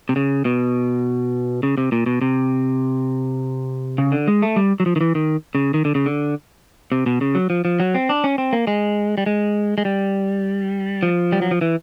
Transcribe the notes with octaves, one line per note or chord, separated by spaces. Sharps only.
C3
C#3
B2
C#3
C3
A#2
B2
C3
C#3
D3
G#3
A3
G3
F#3
F3
D#3
E3
D#3
C#3
D#3
D3
C#3
D3
C3
B2
C#3
F#3
F3
F3
F#3
C4
D4
C#4
C4
A#3
G#3
G3
G#3
G#3
G3
F3
G3
F#3
F3
E3